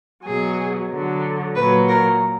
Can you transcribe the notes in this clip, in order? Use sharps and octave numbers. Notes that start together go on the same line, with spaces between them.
B2 F#3 G#4
D3 F#3
A#2 F#3 B4
A#4